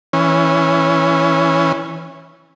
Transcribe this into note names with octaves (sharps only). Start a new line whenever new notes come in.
E3 C#4